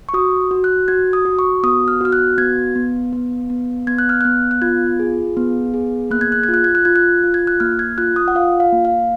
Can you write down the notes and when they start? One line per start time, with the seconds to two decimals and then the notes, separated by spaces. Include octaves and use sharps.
0.09 C#6
0.14 F#4 D#6
0.51 F#4
0.64 F#6
0.88 F#4 G#6
1.13 D#6
1.25 F#4
1.39 C#6
1.63 B3 D#6
1.88 F6
2.01 F#4 F6
2.13 F#6
2.38 B3 G#6
2.76 B3
3.13 B3
3.50 B3
3.87 B3 G#6
3.98 F#6
4.09 F6
4.21 B3 F#6
4.51 F#6
4.62 F4 G#6
4.99 G#4
5.37 B3
5.74 G#4
6.11 A#3 F#6
6.21 G#6
6.32 F#6
6.43 G#6
6.49 F4
6.54 F#6
6.64 G#6
6.75 F#6
6.85 F4 G#6
6.96 F#6
7.24 F4
7.34 G#6
7.47 F#6
7.60 A#3 F6
7.79 G#6
7.98 F4 F#6
8.16 D#6
8.28 F#5
8.35 F4 F5
8.60 F5
8.73 A#3
8.85 F5